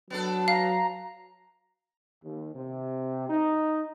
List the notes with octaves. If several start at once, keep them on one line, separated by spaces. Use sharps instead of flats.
F#3 B3 D4 A4
F5 A#5
D#2
C3
D#4